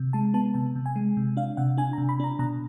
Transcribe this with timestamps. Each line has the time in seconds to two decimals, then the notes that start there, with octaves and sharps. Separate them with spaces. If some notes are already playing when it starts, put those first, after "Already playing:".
Already playing: C3
0.13 G#3 A5
0.34 B3 A5
0.54 C3 A5
0.76 C3
0.86 G#5
0.96 G#3
1.17 C3
1.37 D4 F5
1.57 C3 F#5
1.77 D4 G#5
1.93 A#5
1.98 C3
2.09 B5
2.20 D4 A#5
2.39 B2 A#5